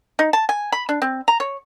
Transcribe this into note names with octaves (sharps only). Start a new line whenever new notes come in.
D#4
A5
G#5
B5
D4
C4
A#5
C#5